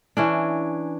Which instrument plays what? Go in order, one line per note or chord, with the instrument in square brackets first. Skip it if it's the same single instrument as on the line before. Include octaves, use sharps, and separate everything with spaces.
[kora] E3 C#4 D4